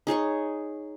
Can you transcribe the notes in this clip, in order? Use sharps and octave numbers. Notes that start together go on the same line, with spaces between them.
D#4 G#4 C#5 C#6